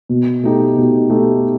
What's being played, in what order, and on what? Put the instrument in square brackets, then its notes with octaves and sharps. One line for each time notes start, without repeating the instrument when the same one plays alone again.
[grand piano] B2
A3 D#4 G4
B2
A3 D#4 G4